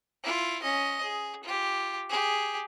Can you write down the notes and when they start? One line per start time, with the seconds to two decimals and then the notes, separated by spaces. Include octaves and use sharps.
0.24 E4 F4
0.62 C#4 D#5
1.03 G#4
1.44 F4 G4
2.09 G4 G#4